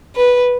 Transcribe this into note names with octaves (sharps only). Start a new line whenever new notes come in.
B4